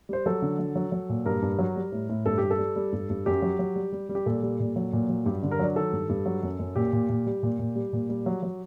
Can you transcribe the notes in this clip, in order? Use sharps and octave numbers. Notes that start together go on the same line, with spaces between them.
G3 C5
F#3 A4
D3
F#3
F#3
F#3
A#2
G2 A#4
G2
F#3
G3
A2
A2
G2 A4
G2 G4
A4
G3
G3
G2
G2
F#2 G4
F#3
F#3
G3
G3
G3
G4
A#2 A4
G3
A#2
F#3
A#2
F#3
G2 G4
D3
A#4
F#3 D5
D#3 A4
G2
G2
F#3
F#2
F#2
A#2 G4
A#2
A#2
G3
A#2
A#2
G3
A#2
G3
F#3
F#3